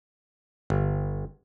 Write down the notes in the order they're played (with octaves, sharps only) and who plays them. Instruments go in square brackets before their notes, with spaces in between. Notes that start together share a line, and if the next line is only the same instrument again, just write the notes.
[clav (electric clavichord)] G1